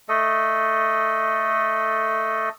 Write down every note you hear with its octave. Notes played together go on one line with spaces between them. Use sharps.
A3 A4 D#5